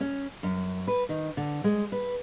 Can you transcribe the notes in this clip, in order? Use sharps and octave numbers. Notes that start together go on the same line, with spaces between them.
C#4
F#2
B4
D#3
D3
G#3
B4